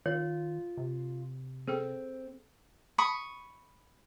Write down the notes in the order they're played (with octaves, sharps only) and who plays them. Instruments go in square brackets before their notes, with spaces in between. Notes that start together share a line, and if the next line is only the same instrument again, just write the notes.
[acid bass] D#3 [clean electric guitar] F4 [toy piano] C#5
[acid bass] C3
[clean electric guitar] C4 [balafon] G#4 A4 G5
[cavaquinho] B5 C#6 D#6